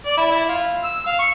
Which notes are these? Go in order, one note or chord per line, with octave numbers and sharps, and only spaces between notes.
D5
E4
E4
F4
E6
F5
C#6